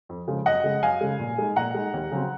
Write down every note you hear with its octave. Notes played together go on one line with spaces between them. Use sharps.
F2
C#3 F3 G#3
F#2 D#5 F#5
C#3 G#3
F#2 F5 G#5
C#3 G#3
A#2
G#3 D#4
A#2 F#5 A#5
G#3 D#4
D#2
C#3 F#3 C4